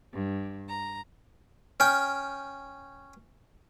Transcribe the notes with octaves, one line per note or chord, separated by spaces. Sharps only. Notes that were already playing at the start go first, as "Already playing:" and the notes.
G2
A#5
C#4 G5 F6